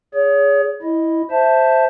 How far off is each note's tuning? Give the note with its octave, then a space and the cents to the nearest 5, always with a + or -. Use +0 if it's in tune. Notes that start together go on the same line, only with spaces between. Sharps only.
G#4 +0 C#5 +35
E4 -10 D#5 +0
C5 +0 E5 +0 A5 +0